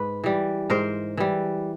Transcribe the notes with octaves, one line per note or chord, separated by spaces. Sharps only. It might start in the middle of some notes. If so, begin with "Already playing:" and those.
Already playing: G#2 B4
E3 G3
G#2 A#4 C5
E3 G3